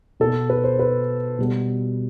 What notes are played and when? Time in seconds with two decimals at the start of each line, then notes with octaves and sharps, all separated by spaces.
0.20 B2 B3 A4
0.50 B4
0.64 C5
0.79 B4
1.39 B2 G3 B3